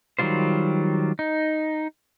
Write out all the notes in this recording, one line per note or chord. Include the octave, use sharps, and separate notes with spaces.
D#3 F#3 G3 F4 C5
D#4